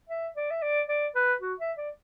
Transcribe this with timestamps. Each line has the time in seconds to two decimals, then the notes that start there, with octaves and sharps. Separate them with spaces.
0.10 E5
0.36 D5
0.51 E5
0.63 D5
0.89 D5
1.15 B4
1.42 F#4
1.60 E5
1.78 D5